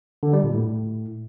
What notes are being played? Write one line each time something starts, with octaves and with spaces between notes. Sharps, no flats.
D3
G3
A#2
A2